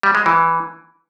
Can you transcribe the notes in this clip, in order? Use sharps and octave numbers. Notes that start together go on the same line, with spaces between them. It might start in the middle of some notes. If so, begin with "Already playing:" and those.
G3
G#3
E3